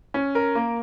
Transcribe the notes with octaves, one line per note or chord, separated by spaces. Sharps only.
C#4
A#4
A#3